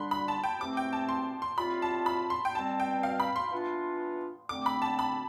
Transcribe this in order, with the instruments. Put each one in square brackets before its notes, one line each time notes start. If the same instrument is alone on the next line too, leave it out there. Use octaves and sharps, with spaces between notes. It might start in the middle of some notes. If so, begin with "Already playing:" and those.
Already playing: [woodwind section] D3 G3 D4 [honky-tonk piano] B5 C6
[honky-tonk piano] B5
A5
G5
[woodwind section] C3 E3 A3 C4 [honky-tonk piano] D6
[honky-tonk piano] G5
A5
C6
C6
[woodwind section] A2 G3 C4 F4 [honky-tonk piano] B5
[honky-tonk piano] A5
B5
C6
G5
[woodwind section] B2 G3 C4 [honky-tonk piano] A5
[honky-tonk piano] G5
F5
B5
C6
[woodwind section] E3 B3 D4 F4
[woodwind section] D3 A3 C4 [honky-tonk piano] D6
[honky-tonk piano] B5
A5
B5